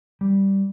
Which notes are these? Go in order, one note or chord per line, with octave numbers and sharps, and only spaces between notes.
G3